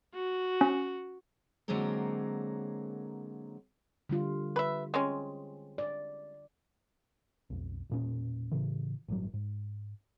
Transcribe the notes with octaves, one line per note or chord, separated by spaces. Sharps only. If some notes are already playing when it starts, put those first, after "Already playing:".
F#4
C#4
D3 F#3 G#3 A#3 C4 A#4
D3 G3 F4
B4 E5
G#3 C4 C#4
D5
B1 F2
E1 A#2 C#4
A2 C#3 E3
A1 G2 F#3
G#2